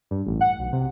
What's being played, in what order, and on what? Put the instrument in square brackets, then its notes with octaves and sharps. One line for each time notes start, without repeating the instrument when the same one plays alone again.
[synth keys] G2
A1
F#5
B1
C3